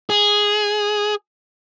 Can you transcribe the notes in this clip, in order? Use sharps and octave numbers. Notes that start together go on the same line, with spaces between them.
G#4